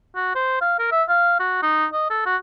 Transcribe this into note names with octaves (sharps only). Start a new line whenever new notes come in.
F#4
C5
F5
A#4
E5
F5
F#4
D#4
D#5
A4
F#4